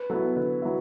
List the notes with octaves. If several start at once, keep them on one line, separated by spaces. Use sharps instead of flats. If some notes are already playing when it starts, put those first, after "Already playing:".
Already playing: B4
F#3 B3 E4 A4
D3 B4
F#3 B3 E4 E5